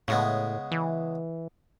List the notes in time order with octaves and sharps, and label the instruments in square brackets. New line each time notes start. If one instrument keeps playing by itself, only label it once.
[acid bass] A2 [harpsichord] C#3 G#3 B3
[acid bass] E3